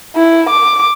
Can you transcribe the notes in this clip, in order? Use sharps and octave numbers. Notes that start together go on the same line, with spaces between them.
E4
D6